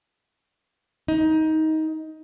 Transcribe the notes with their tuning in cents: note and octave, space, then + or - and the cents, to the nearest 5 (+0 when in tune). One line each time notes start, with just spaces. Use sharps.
D#4 +20